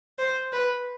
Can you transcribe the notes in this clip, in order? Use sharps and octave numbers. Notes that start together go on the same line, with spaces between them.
C5
B4